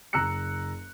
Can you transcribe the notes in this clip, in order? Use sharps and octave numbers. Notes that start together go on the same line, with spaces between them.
F#1 A#5 E6 F#6 C#7